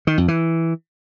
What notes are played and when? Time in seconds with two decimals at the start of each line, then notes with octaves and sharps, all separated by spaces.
0.07 D#3
0.18 F2
0.28 E3